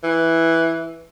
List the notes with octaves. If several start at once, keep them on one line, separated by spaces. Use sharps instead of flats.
E3